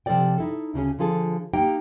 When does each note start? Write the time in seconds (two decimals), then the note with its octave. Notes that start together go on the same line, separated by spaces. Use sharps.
0.06 C3 F3 B3 A4 D5 G5
0.38 D#4 E4 A4
0.74 D2 C#3 C#4 G#4
0.99 D3 F3 F4 G#4 A4
1.53 A#3 D#4 G4 G5